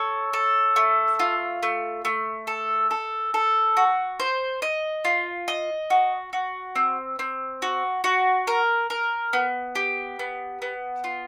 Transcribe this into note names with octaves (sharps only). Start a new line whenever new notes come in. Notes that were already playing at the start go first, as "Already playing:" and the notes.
Already playing: A4 C#5
A4
A3
F4
A3
A3
A4
A4
A4
F#4
C5
D#5
F4
D#5
F#4
F#4
C4
C4
F#4
F#4
A#4
A#4
B3
G4
B3
B3
F4